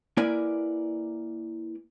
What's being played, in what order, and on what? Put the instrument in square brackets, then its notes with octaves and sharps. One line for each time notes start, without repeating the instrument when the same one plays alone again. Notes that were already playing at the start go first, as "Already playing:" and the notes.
[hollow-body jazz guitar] A#3 E4 A#4 B4 D5 G#5